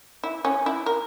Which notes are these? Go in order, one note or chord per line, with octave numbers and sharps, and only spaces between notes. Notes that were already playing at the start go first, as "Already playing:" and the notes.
E4
C#4
E4
A#4